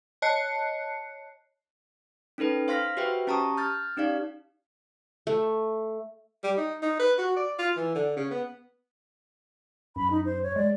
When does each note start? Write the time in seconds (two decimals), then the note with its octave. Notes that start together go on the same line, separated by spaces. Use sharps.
0.22 C#5 D#5 A5 F#6 C7 C#7
2.38 C#4 D#4 A4 B4 G5
2.68 C5 F5 C6 F6 A#6 B6
2.97 F#4 G4 B4 C5 E5 G5
3.27 C#4 G4 A5 A#5 C#6 D#6
3.57 F6 G6 A6
3.97 C#4 D#4 G4 D5 F5
5.27 A3
6.44 G3
6.57 D#4
6.82 D#4
7.00 B4
7.19 F#4
7.36 D5
7.59 F4
7.76 E3
7.95 D3
8.17 C#3
8.31 B3
9.96 F#2 B5
10.11 D#4
10.25 C5
10.43 C#5
10.56 G#3 D5